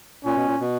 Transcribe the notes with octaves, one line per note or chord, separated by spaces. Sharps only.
A#2 C#4
B2
A#2
B2